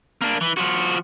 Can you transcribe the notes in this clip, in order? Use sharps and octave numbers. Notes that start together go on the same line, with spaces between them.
A#3 D4
E3
F3 F#4